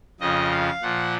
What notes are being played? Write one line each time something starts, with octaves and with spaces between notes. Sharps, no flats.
F2 C#3 F3 D#5
F5
A#2 F3 F#5